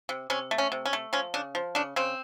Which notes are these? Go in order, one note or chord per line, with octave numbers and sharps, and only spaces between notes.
C3
C3 C#4
A3
C#4
C3
C#4
A3
F3 C#4
C#3 D4
F3
C#3 D4
C#3 C4